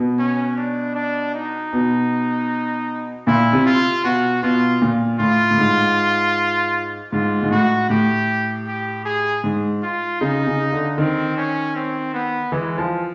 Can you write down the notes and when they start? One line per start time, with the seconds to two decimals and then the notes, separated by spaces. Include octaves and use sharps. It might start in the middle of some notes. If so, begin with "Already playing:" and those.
Already playing: B2
0.19 C#4
0.57 D4
0.95 D4
1.34 D#4
1.73 B2
3.27 A#2 E4
3.53 C3
3.66 F4
4.04 B2 F#4
4.43 B2 F4
4.82 A#2
5.20 A2 F4
5.51 A2
5.58 G#2
7.12 G#2 F4
7.43 G#2
7.51 A2 F#4
7.89 A2 G4
8.67 G4
9.05 G#4
9.44 G#2
9.83 F4
10.21 C#3 D#4
10.47 C#3
10.72 D3
10.98 D#3 C4
11.37 C#4
11.75 C4
12.14 B3
12.52 E3 G#3
12.78 F3